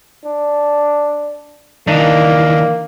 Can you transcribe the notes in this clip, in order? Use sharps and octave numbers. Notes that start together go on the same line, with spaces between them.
D4
D#3 E3 A#3 D4 D#4